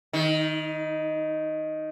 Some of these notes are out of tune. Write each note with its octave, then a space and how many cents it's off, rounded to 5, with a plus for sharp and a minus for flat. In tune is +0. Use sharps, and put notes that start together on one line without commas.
D#3 +0 D#4 +45